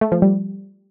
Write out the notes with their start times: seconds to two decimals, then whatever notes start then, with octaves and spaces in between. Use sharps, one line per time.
0.01 A3
0.12 F3
0.22 G3